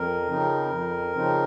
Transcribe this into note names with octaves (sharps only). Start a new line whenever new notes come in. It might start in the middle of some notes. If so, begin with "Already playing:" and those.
Already playing: F2 A#4
C#3 F3 C4 D#4
F2
C#3 F3 C4 D#4